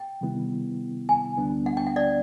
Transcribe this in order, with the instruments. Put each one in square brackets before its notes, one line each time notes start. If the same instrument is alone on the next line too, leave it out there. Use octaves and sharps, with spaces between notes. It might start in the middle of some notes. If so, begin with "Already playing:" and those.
Already playing: [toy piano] G5
[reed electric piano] C3 D#3 G3 B3 E4
[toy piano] G#5
[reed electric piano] D2 D3 G3 B3 D4
[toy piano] F#5
G5
F#5
D5